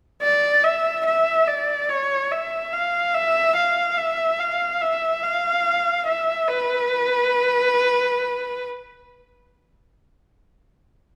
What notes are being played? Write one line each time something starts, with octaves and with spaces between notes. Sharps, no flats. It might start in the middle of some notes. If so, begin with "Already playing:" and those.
D5
E5
E5
D5
C#5
E5
F5
E5
F5
E5
F5
E5
F5
E5
B4